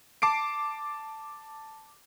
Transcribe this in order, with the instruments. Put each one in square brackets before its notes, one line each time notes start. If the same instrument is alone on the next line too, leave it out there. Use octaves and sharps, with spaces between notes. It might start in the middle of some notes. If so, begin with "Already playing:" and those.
[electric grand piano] A5 D6 C7 D7